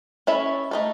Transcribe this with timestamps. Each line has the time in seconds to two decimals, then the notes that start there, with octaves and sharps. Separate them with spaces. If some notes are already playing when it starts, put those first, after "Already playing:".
0.27 C#4 E4 A4 C#5 E5
0.71 A3 D#4 A4